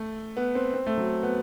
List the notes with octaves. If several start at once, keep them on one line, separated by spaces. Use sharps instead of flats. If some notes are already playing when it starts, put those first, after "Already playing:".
Already playing: A3
B3
C4
C4
A3
F#3
B3